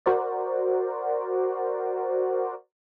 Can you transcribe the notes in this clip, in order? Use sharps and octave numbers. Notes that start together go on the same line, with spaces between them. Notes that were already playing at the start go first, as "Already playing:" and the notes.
F#4 A#4 C5 D5